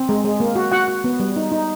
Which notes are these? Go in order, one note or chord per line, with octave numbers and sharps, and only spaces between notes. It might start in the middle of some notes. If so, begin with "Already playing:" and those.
Already playing: C4
G#3
G#3
A#3
F#4
F#4 F#5
F#4
B3
G3
D#4
D#4